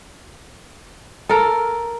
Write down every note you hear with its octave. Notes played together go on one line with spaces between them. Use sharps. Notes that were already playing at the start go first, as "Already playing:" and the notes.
A4 A#4